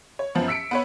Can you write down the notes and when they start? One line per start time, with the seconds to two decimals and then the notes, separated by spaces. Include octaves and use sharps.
0.19 C#5
0.35 F#2 F3 B3
0.48 E6 B6 C#7 D7
0.71 B3 B4 C#5